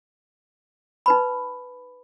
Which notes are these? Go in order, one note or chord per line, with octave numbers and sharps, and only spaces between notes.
D#4 B4 B5